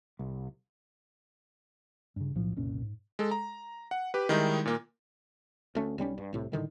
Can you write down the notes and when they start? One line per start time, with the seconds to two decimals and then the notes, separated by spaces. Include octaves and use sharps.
0.19 C2
2.16 G2 C#3
2.35 B1 A2 F3
2.56 F#1 C2 A#2 C#4
2.82 G#2
3.19 G#3 A4
3.31 A#5
3.91 F#5
4.14 G4 B4
4.29 D#3 G3 G#3 D#4 E4
4.66 A#2 A#3
5.75 D2 A3 C#4
5.98 B1 G3 C4 C#4
6.18 G2
6.33 C2 A2 C3
6.52 A2 D3 D#3 G3